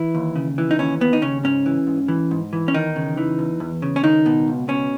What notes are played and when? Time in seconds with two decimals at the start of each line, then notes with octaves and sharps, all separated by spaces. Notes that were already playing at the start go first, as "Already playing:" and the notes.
Already playing: E3 E4
0.15 D#2
0.36 C#3
0.58 E3
0.71 D#4
0.79 D#2 C#4
1.01 D#2 B3
1.13 D#4
1.22 C#3 C#4
1.44 G#2 C#4
1.66 E3
1.87 G#2
2.08 E3
2.31 G#2
2.53 E3
2.68 C#4
2.74 E2 D#3 D#4
2.96 C#3
3.17 E3
3.39 E2
3.60 E2
3.82 C#3
3.96 C#4
4.04 C#2 D#3 D#4
4.26 B2
4.48 C#2
4.68 B2 C#4